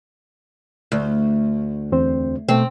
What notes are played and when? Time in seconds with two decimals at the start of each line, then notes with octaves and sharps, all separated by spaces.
0.92 D2
1.92 E2 C4 C5
2.49 B2 A3 C4